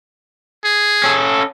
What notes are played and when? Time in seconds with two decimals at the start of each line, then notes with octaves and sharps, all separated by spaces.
0.64 G#4
1.04 C#4 A4